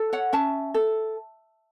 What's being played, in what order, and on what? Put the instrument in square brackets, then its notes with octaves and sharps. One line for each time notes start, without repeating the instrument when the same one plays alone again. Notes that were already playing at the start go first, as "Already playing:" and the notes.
Already playing: [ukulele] A4
C#5 F#5
C#4 E5 A5
A4